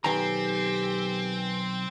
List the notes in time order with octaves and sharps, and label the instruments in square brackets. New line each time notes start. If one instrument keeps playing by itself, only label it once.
[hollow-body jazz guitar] B1 D#3 A#5 [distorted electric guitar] C4 [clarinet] G4 [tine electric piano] B4 G#5